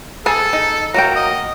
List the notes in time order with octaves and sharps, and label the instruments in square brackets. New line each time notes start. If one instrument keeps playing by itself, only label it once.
[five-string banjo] G#4 G#5 A5 [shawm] A4
[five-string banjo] D#4
[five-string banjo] F#3 A#3 G5 [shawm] A#5
[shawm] D#5